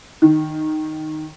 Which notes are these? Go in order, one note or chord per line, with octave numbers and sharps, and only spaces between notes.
D#3